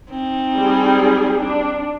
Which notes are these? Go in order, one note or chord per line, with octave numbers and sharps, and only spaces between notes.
C4 D#4
G3 G#4
D4